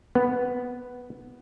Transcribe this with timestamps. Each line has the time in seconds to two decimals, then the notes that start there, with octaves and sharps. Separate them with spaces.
0.15 B3